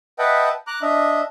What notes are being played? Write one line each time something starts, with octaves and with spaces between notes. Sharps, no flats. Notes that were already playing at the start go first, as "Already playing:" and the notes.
B4 D#5 E5 F#5 G5 A5
A#5 D6 F#6
D4 D#5 E5